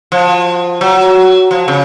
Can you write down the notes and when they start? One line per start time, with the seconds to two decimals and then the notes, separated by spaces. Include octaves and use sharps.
0.12 F3
0.81 F#3
1.51 F3
1.68 C#3